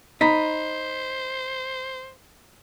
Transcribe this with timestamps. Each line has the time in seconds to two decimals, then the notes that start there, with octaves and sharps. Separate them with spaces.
0.21 D#4 C5 B5 B6